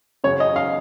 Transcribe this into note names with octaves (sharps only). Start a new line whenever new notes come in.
F#2 C#3 C#5
D#5
F5